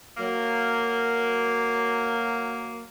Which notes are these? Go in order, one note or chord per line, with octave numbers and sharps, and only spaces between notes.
F#3 A#3